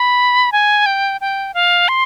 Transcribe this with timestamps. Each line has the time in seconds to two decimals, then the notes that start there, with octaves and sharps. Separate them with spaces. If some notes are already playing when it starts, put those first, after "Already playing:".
Already playing: B5
0.52 G#5
0.86 G5
1.21 G5
1.54 F5
1.88 C6